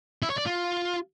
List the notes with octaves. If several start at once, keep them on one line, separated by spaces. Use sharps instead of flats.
E4
C#5
D5
F4